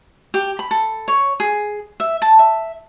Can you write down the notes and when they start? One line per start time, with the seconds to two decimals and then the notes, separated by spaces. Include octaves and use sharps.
0.34 G4
0.59 B5
0.71 A4
1.08 C#5
1.40 G#4
2.00 E5
2.22 A5
2.39 E5